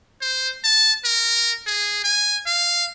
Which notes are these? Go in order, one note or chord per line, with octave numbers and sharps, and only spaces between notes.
C5
A5
A#4
G#4
G#5
F5